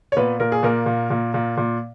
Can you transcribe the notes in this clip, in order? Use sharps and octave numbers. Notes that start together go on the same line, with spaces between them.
C#5
A#2 B3 B4
A#2 A#4
G#4
A#2 A#3 A#4
A#2
A#2
A#2
A#2